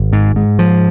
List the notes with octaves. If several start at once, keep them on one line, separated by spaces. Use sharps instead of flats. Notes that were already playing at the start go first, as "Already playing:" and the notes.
Already playing: G#1
G#2
G#2
F3